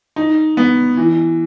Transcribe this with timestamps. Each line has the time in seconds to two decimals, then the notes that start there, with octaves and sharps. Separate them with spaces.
0.16 D#4
0.57 B3
0.97 E3